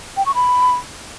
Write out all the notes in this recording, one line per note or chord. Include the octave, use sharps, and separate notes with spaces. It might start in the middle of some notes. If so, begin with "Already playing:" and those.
G5
C#6
B5